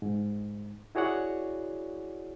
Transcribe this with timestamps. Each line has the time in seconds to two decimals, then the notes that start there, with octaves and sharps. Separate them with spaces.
0.02 G#2
0.95 E4 F#4 G#4 C#5 D5 F#5